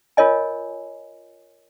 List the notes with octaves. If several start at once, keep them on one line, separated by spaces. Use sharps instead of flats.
F4 A#4 C#5 D#5 G#5